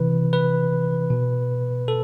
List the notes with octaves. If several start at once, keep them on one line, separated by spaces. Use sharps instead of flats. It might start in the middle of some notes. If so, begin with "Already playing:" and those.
Already playing: C3 E3 B4
B4
B2
A4